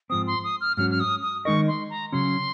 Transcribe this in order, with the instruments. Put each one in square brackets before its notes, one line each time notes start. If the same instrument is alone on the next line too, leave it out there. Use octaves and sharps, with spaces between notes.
[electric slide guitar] G#2 F3 C4 [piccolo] D#6
[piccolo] C6
D#6
F6
[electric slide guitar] G#2 F#3 C#4 F#4 [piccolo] F6
[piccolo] F6
D#6
D#6
[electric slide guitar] D#3 G#3 D#4 A#4 D#5 [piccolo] C#6
[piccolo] C6
A#5
[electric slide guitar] C#3 F#3 C#4 [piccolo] C6